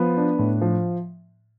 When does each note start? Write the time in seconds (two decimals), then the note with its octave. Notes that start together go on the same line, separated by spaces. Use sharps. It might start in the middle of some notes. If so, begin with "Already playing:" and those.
Already playing: F3 B3
0.17 D4
0.39 A2
0.62 F3